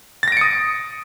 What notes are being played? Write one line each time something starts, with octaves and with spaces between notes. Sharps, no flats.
D#6 A6 A#6 C#7 D7